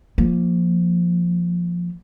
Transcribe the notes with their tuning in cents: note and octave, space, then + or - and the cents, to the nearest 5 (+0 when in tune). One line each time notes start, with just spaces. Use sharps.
F3 +0 A#3 +0